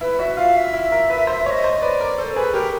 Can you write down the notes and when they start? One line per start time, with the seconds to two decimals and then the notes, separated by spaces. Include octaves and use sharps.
0.01 E4 B4
0.19 F#4 E5
0.37 F4 F5
0.56 E5
0.73 E4
0.92 A#4
1.10 B4
1.27 C5
1.45 C#5 D#5 E5
1.64 C5
1.81 B4 D5
2.00 A#4
2.18 A4 C5
2.36 G#4 B4
2.54 G4 A#4